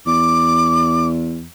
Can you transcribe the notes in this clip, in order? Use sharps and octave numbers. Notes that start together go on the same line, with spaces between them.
E2 D6